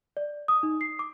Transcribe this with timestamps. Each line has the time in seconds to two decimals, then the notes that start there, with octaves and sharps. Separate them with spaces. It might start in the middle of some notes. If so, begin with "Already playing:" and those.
0.17 D5
0.48 D#6
0.63 D#4
0.81 C7
0.99 D6